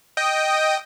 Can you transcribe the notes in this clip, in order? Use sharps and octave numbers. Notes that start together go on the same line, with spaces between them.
D#5 G5 D#6